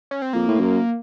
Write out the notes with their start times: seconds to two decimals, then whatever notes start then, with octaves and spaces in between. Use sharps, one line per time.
0.11 C#4
0.22 C4
0.33 F2 A#3
0.48 A2
0.60 F#2